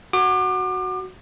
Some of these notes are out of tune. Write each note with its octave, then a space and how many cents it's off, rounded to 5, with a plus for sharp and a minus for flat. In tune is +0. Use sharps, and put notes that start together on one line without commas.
F#4 +0 D6 +35